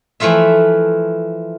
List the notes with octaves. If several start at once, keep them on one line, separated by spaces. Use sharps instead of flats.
E3 F3 A3 F4 E5